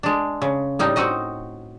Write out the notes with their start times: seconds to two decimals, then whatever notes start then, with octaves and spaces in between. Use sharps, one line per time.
0.03 G#3 D4
0.42 C#3
0.79 A2 G3 D#4
0.96 C4 D#4 F#4 D#5